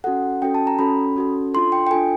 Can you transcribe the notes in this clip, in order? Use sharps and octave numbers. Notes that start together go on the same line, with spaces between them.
C#4 F#4 A4 F#5
C#4 F#4 A4 G5
A5
A#5
C#4 F#4 A4 B5
C#4 F#4 A4
D4 F4 A4 C6
G5
G5
D4 F4 A4 G#5